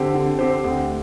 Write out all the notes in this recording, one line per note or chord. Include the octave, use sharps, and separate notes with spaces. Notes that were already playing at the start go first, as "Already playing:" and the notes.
Already playing: D3 C4 G4 C5
D3
C4 G4 C5
D2